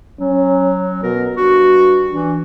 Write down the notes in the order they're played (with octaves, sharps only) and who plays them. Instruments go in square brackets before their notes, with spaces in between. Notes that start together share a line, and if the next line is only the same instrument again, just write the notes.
[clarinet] F#3 [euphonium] C#4
[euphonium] B2 [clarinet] A#4
[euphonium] G2 [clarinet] F#4
[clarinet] E3 [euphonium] D4